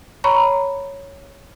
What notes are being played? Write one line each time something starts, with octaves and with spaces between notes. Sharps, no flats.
C#5 A#5 B5 C#6